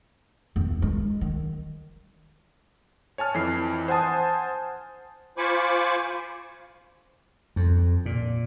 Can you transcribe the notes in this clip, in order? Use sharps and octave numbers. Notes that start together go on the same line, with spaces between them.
E2
G#3
D#3
C#5 G#5 A5 F6
F2 E3 C7
C5 F#5 G#5 A5 D#6
F4 C5 G#5 B5 C#6 D6
F2
A#2